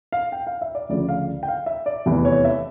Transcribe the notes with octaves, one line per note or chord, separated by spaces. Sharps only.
F5
G5
F5
E5
D5
D2 C#3 F3 D5
F5
G5
F5
E5
D5
F1 E2 E3
C#5
E5